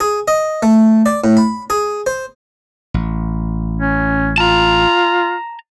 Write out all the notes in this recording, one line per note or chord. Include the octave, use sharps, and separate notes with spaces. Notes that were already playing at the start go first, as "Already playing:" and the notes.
G#4
D#5
A3
D5
A2
B5
G#4
C5
A1
C#4
F4 A5 A#5